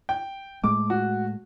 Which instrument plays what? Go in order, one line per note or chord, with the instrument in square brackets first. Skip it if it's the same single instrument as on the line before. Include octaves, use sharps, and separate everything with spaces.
[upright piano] G5
[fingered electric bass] A2 G#3 A3 [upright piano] D6
[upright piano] F#4